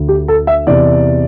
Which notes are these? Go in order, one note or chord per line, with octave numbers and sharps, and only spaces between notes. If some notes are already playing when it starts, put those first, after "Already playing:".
Already playing: D2 D3
G4
A4
E5
E2 C3 E3 D5